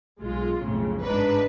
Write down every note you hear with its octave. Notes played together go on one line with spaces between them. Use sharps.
B1 G#3 F4
B1 F2 A2 C#3
G1 G#2 D4 D#4 B4